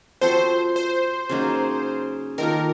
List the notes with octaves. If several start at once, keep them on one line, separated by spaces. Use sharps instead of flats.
F3 C4 F#4 A4 C5
C5
C#3 F#3 A#3 D#4
D#3 A#3 F4 A4 A#4